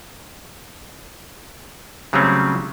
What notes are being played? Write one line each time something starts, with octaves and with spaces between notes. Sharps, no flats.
C#3 F#3 G3 A3 C4 C#4